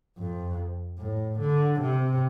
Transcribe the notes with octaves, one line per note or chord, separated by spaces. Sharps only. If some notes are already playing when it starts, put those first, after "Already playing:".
F2
A2
D3
C3